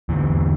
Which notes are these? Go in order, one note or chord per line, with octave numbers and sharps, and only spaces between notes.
E2 D3 E3